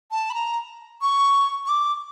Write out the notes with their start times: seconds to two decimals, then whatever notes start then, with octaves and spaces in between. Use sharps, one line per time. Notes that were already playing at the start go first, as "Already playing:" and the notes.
0.11 A5
0.30 B5
0.34 A#5
1.02 C#6
1.65 C#6
1.69 D6